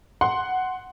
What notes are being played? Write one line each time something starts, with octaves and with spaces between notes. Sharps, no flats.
F#5 C6